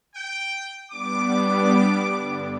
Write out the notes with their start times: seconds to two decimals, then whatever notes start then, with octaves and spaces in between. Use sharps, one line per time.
0.15 G5
0.91 G3 B3 D4 D6
2.12 G2 D3